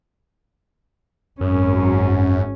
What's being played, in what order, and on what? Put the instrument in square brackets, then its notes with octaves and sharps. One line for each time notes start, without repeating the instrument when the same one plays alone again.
[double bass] G#1 C#4 [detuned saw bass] F#2